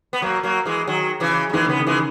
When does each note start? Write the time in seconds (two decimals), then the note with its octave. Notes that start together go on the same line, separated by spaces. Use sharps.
0.13 B3
0.22 F#3 A#3
0.43 F#3 A#3
0.66 E3 G#3
0.88 D#3 F#3
1.20 C#3 E3
1.49 F#3
1.53 D#3 E3 G#3
1.67 C#3 G#3 B3
1.80 D#3
1.87 E3 G#3